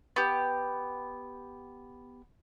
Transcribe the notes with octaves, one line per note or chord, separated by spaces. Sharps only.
B3 G4